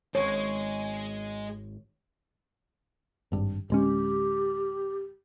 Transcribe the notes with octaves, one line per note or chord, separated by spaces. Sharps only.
G#1 G#3 C#5
G#1 G2
D1 G#3 C#4 G4